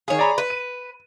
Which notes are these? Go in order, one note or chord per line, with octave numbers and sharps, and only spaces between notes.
D#3 G#4 C#5 F5
D5 A#5 B5
B4
D#7